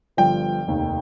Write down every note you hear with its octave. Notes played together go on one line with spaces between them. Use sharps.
G1 G2 F3 G5
F1 D#2 D#3